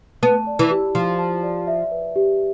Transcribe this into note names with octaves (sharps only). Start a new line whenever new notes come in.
B3 A5
D5
E3
G4
F3 C6
A5
D5
E5
B4
G4